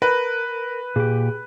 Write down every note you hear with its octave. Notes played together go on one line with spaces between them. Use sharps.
A#4 B4
A#2 G4 G#4